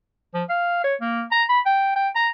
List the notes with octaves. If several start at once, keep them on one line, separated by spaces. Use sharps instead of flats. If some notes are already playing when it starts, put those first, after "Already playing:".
F3
F5
C#5
A#3
A#5
B5
G5
G5
A#5